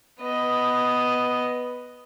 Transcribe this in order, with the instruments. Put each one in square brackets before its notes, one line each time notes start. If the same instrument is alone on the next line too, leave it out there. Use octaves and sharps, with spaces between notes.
[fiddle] B3 D#5